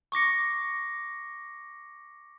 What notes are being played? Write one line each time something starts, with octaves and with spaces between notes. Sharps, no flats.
C#6 D6 A#6 C#7